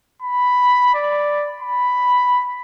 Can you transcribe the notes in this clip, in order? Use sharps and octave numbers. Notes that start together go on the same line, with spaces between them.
B5
D5
B5